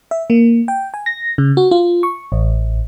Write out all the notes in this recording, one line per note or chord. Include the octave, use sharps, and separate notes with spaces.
E5
A#3
G5
G#5
A#6
C#3
F#4
F4
C#6
A1